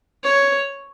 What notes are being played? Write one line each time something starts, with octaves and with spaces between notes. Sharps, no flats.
C#5